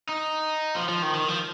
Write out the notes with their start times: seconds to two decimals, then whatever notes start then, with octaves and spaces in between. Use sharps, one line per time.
0.09 D#4
0.76 F3
0.89 F3
1.02 D#3
1.14 D#3
1.28 F3